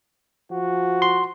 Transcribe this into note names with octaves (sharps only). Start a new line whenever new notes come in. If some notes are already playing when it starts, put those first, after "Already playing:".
F3 F#4
C6